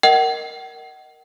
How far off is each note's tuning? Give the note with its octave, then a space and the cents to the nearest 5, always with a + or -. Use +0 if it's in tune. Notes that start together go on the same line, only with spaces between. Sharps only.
A#4 +0 D#5 +0 F#5 +40